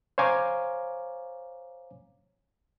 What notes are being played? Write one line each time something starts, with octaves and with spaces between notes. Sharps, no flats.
C5 C#5 F5 G#5 A#5 D6